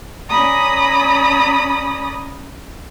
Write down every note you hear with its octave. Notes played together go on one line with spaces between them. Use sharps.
C#4 D5 A#5 B5 D#6